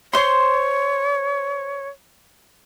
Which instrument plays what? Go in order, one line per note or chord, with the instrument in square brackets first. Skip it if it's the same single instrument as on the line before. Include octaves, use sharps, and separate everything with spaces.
[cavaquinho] C5 C6 [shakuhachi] C#5